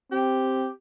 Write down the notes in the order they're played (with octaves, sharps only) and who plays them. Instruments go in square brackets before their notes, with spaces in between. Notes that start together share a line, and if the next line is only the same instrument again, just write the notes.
[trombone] C4 [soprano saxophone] G4